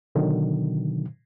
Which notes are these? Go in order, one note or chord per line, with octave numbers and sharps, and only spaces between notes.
B2 D3 D#3 F#3